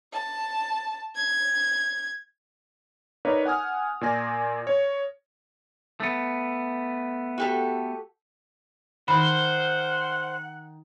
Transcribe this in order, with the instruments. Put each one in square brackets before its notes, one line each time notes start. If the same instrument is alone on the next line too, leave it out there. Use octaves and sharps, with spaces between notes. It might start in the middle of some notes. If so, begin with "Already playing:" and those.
[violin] A5
G#6
[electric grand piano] D#4 A#4 B4 C#5 D5 F5
F#5 G#5 D#6 F6
A#2 D5 G#5 A#6
C#5
[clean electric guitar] A3 B3
[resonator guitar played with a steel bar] F#4 G4 A4
[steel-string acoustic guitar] D#3 [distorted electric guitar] C5 [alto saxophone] F#5 [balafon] B5